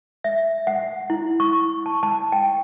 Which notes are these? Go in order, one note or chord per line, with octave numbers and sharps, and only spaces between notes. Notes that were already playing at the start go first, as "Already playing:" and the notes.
E5
F#5
E4
C#6
A5
A5
G5